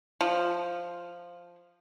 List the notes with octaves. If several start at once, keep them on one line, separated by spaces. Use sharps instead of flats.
F3